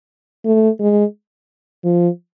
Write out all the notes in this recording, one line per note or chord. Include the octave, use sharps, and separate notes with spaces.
A3
G#3
F3